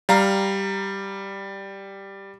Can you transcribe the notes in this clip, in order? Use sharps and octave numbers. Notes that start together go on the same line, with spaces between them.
G3 F5 A#5